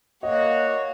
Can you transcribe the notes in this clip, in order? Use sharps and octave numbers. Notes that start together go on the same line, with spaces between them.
A#3 F#4 C#5 D#5